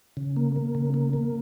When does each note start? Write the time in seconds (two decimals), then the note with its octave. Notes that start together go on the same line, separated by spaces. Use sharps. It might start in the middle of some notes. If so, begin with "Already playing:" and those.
0.17 C#3
0.36 A#3
0.56 A#3
0.75 C#3
0.94 A#3
1.13 A#3